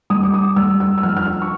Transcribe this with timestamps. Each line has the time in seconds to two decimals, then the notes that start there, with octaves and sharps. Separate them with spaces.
0.10 G3 D#6
0.23 D6
0.34 D#6
0.56 G3 E6
0.80 E6
0.98 E6
1.03 F3 F6
1.17 F6
1.26 E6
1.42 C#6